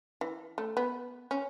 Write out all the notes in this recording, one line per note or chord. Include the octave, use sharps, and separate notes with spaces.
E3
A3
B3
C#4